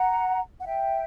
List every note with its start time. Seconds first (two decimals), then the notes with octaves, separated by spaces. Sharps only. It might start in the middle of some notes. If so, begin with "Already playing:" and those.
Already playing: F#5 A#5
0.60 F#5
0.65 E5 G5